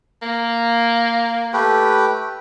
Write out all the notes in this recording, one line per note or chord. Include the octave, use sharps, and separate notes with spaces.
A#3
A3 G4 B4